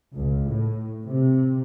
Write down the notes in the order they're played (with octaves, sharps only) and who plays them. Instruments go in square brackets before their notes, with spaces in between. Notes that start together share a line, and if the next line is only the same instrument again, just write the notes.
[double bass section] C#2
A2
C3